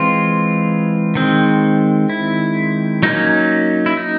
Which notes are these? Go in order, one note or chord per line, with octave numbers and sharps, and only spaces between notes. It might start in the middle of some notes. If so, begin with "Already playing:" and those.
Already playing: E3 G#3 C4 F4
D#3 G#3 C4
E4
F#3 A#3 C#4 D#4
E4
D#4